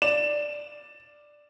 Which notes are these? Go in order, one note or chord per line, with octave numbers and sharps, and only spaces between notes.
D5 E7